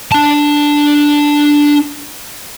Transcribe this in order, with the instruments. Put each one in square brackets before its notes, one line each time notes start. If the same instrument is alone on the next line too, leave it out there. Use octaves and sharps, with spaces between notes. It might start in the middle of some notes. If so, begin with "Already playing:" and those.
[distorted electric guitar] D4 A5